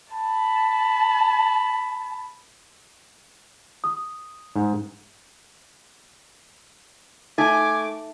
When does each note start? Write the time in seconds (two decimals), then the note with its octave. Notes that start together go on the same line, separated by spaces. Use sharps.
0.13 A5 B5
3.84 D#6
4.56 G#2
7.38 A3 D#4 G#5 D6